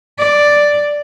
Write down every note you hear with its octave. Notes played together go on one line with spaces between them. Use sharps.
D5